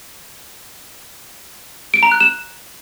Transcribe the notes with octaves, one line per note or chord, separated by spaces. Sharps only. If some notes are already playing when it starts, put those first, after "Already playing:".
D7
A#5
F#6
E7